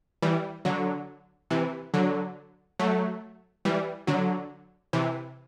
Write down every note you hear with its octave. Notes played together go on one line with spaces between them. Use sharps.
E3 G3
D3 F#3
C3 E3
D3 F#3
F#3 A3
E3 G3
D3 F#3
C3 E3